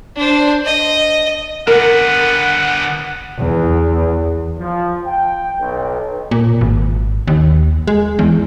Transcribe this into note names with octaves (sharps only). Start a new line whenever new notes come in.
D4 C5
D#5
D3 B3 A#4 F#5
E2
F3
G5
B1
A#2
G#1
D#2
G#3
E2